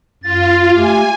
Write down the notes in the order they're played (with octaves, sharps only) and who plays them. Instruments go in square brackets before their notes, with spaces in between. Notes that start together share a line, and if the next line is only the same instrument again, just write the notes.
[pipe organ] F#2 A6 [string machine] F4
[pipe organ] A3 G4 [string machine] G#5